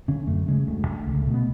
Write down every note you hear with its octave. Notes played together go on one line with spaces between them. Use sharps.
D3 C#4
F#2 A3
C#3 G#3
D2 A3
D3
C#2
A3
B2
B3